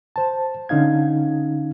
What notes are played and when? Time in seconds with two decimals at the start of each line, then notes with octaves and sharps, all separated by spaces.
0.16 C5 A5
0.69 D3 C#4 D#4 F5 G#6